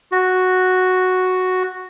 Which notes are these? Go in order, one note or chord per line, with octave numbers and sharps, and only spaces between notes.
F#4